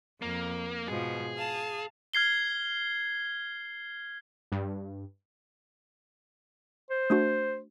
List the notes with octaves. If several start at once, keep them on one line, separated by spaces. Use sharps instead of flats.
F2 A#3
G#2 B2 F3 G#4
F5 A5
F6 G#6 C7 G7
G2
C5
A3 D4 F#4